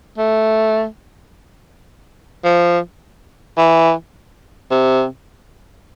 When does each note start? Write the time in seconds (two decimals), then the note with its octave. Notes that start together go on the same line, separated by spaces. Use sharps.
0.18 A3
2.45 F3
3.57 E3
4.71 C3